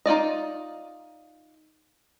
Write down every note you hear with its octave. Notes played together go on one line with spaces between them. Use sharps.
D#4 F4 D5 D#5